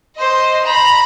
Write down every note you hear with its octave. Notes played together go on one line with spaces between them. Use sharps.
C5 D#5
A#5 B5